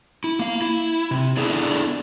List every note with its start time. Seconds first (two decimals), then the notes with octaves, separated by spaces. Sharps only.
0.24 E4
0.39 A#3 F5
0.62 E4
1.11 C3
1.37 B3 D4 E4 G#4 A4